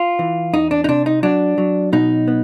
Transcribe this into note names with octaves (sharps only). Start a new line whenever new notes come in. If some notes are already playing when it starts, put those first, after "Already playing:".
Already playing: F4
E3
E2 D#4
D4
D#4
C3 D4
D#4
F#3 D4
F#3
B2 D#4
B3